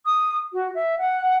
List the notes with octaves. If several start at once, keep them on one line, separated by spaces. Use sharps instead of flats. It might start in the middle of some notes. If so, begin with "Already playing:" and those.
D#6
F#4
E5
F#5